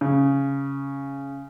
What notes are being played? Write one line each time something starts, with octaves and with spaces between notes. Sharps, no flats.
C#3